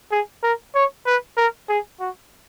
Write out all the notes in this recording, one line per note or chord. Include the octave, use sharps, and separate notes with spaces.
G#4
A#4
C#5
B4
A#4
G#4
F#4